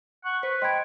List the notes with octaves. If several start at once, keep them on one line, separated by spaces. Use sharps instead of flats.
F#5 C#6
B4 C5
D#5 G5 B5 C6 G#6